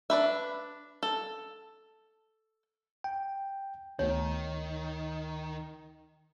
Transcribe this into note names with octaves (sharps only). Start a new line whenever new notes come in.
D4 B4 E5
A4
G5
D2 D#3 A3 B3 C#5